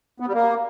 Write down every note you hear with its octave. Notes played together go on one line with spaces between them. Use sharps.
B3
G3
A#3